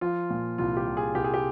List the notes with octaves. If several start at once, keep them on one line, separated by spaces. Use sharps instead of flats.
F3 F4
A#2
C2 F4
G4
C2
G#4
C2 G4
G#4
G4